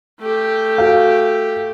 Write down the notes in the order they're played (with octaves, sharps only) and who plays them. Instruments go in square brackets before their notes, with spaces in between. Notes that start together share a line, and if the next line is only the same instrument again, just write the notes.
[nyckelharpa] A3 G4
[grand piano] F#4 A4 F5